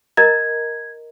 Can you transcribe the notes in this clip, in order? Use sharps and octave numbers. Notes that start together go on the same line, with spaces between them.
A#4 D#5 A#5 G#6